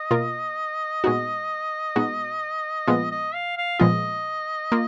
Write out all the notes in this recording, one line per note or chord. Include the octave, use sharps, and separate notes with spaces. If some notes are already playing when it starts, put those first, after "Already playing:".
Already playing: D#5
B2 A#3 F4 A#4
A#2 G#3 B3 D#4 F#4
A#2 G#3 B3 D#4 F#4
A#2 F3 G#3 B3 F4
D#5
F5
F5
A#2 F3 G#3 B3 F4 D#5
A#3 F4